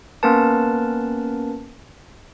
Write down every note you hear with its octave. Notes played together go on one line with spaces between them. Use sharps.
A#3 B3 C#4 A#4 B4 A5